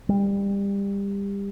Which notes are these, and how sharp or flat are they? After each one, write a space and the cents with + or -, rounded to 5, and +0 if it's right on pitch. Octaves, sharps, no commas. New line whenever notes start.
G3 +25